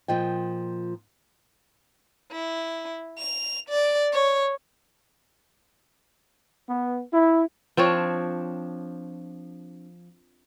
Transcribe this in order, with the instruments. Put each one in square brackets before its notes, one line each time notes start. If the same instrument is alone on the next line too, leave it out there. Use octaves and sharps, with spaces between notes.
[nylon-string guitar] A#2 F3 D#5 G5
[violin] E4
F7
D5
C#5
[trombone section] B3
E4
[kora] F3 C4 D4 C#5